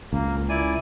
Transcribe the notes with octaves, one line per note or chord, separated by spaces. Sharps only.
C#2 A#3
E4 D5 G#5